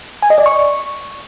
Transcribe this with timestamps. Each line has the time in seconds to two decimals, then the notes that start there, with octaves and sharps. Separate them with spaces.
0.22 G#5
0.30 D#5
0.38 D5
0.46 C#6